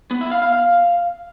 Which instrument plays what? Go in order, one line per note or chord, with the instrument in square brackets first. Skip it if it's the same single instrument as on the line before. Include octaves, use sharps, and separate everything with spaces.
[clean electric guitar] B3
E4
F5
F5
F5